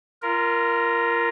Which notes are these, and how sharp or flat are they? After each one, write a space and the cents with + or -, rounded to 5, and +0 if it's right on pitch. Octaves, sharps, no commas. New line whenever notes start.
F4 -25 A#4 +0